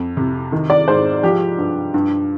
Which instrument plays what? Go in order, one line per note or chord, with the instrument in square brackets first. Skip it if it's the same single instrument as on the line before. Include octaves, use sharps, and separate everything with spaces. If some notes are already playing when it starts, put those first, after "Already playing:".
Already playing: [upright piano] F2
C3
D#3
D5
G#2 C5
F3 G4
G2
G2